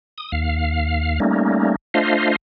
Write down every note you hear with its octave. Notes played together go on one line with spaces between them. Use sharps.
D#6
D#2 F5
G3 A3 A#3 C#4 D#4
A3 D4 F4 C5 D#5 F5